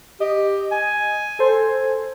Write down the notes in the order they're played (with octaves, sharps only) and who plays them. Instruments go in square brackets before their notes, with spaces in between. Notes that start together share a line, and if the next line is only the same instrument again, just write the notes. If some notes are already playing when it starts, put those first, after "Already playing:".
[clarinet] G4 [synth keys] D#5
[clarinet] G#5
[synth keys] A4 C5